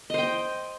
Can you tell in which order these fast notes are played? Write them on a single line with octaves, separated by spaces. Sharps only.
D#5 C5 G5